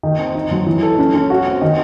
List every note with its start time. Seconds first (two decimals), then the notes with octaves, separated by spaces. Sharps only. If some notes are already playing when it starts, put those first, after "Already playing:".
0.03 D#3
0.19 C4
0.35 D#4
0.51 F#3
0.66 E3
0.82 A4
0.98 C#4
1.14 C#4
1.30 F#4
1.46 C4
1.62 D#3